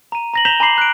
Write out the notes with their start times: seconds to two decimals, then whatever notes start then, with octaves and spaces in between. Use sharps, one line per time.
0.12 A#5 D#7
0.34 A#5 A#6 F#7
0.45 A#5 G6 B6 E7 F7 G7
0.60 G#5 A#5 B5 D6 C7 F#7
0.78 F#6 D7